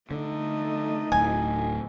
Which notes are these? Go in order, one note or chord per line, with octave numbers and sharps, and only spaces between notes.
D3 A3 D#4
D1 A2 G#5